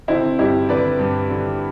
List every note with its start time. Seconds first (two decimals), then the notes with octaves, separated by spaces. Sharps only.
0.08 D3 C4 E4
0.39 G2 E4 G4
0.69 D3 B4 D5
0.99 G2
1.30 D3